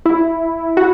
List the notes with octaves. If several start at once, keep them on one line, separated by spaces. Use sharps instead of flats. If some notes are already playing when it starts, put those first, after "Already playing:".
E4
F#4